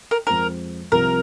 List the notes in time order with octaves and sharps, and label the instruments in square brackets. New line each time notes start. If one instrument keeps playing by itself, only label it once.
[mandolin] A#4
[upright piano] F2 F3 G#3 F4 C5 [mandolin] A#4
[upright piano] C2 C3 F3 C4 [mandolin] A#4